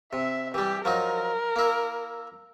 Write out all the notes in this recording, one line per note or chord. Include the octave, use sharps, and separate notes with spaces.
C3 E5
E3 G3 G4
F3 F#3 D#4 A#4
A#3 E4